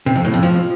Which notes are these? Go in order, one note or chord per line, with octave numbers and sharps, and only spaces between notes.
C3
F2
A2
F2
F3